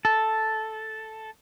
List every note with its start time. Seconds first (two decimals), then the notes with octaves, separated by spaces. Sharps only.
0.05 A4